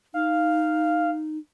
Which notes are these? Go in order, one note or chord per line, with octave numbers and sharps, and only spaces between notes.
D#4 F5